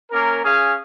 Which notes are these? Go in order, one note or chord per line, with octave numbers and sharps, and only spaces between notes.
A#3 C#4 A#4
C#4 G#4 F5